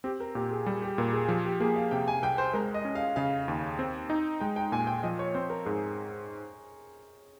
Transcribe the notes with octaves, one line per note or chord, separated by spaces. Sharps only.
C4 G4
A#4
A#2 G4
G#4
G3 G#4
G4
A#2 A#4
G#4
F3 G4
G4
A#3 G#4
F5
C3 G5
G#5
C2 G5
C5
G#3 A#4
D#5
C#4
F5
C#3 F5
D#2
C4
D#4
G#3 G5
G5
A#2 G#5
G5
F3 D#5
C#5
C4 C5
A#4
G#2 G#4